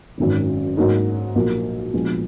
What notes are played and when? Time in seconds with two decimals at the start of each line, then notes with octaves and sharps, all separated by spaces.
0.18 G#1 F#2 D#3 F#3
0.77 G#2 F#3 A#3 D#4
1.35 B1 A#2 F3 A#3
1.94 A#1 A#2 G#3 B3